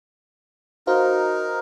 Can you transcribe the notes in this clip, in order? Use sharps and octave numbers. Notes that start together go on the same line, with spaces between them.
D#4 F#4 A#4 C5 F5